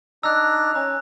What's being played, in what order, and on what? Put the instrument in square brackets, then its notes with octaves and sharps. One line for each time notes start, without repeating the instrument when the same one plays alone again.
[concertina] D4 D#4 A#5 [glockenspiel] E6 F#6
[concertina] C#4 [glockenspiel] A#5